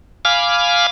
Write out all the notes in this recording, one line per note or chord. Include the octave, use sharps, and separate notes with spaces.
F5 G#5 B5 D6 F6